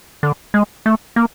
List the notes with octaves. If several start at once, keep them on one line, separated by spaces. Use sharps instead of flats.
D3
G#3
A3
A#3